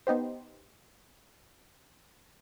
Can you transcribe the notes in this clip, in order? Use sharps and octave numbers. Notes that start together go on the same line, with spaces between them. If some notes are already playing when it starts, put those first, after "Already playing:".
B3 D#4 G4 C5